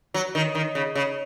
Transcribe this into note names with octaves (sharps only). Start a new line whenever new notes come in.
F#3
D#3
D#3
C#3
C#3